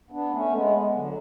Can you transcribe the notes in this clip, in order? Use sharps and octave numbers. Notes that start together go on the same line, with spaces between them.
B3 D4
A3 C#4
G#3 B3
D3 F#3